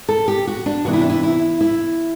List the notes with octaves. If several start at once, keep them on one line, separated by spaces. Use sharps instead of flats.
A4
G4
F#4
D4
C3 E3 B3 D4 F#4
E4
D4
E4
E4
E4